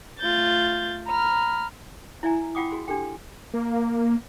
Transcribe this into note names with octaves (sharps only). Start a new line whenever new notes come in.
A3 F4 G6 A6
A#5 B5 F6
E4 D5 E5 G#5 A#5
F4 F#5 G5 D6 D#6
F#4 G#4 C6
D4 G4 A4 G5
A#3